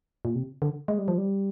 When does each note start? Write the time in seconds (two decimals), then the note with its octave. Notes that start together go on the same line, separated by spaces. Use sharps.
0.25 A#2
0.35 C3
0.62 D3
0.88 G#3
0.98 G3
1.08 F3
1.18 G3